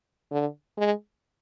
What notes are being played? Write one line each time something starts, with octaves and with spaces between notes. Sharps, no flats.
D3
G#3